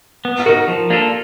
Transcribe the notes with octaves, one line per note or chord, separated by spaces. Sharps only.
B3
D#4 F#4 A#4
F3
A#3 D4 F4 A4